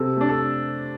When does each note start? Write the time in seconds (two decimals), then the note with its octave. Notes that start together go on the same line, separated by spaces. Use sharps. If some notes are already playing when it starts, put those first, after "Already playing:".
Already playing: C3 A4
0.17 A3 D4
0.29 A4